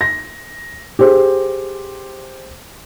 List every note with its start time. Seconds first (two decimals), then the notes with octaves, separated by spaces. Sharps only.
0.01 A#6
0.99 G4 G#4 C5